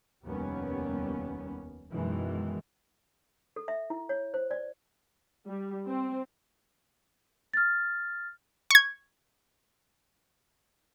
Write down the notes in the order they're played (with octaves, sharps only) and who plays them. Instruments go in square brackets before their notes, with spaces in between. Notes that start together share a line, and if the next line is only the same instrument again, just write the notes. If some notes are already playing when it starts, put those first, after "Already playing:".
[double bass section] F1 D#2 G3 B3 C#4
F#2 B2 D#3 E3 G#3
[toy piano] A4
E5
E4
C#5
C5
D5
[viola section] G3
C4
[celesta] F6 A6
[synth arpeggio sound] C#6 G#6